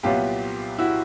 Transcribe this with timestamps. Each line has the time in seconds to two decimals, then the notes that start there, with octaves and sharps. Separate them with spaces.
0.03 C2 A#2 F#3 B3 F4 G4
0.78 E4 F#4